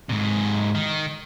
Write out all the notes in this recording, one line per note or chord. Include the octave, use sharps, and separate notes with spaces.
G#2 C3
D#3